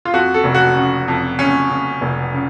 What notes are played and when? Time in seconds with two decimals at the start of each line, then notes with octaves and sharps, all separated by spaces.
0.05 F4
0.13 F2 F#4
0.34 A4
0.44 F1
0.54 F#4
0.75 C#3
1.08 F2
1.38 C#3 C#4
1.70 C#3
2.01 F1
2.33 C#3